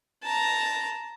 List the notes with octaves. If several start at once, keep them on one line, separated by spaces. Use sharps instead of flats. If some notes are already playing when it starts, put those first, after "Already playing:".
A5 A#5